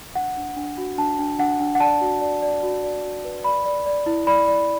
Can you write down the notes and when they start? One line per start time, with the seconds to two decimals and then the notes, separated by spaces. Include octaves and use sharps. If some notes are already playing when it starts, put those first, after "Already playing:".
0.15 D4 F#5
0.37 D4
0.56 D4
0.78 F#4
0.98 D4 A5
1.19 D4
1.39 D4 F#5
1.60 D4
1.75 F#5
1.80 D5 A5
2.01 F#4
2.21 D5
2.42 D5
2.63 F#4
2.84 D5
3.03 F#4
3.25 B4
3.44 D5 B5
3.65 D5
3.86 D5
4.06 E4
4.27 D5 B5
4.48 D5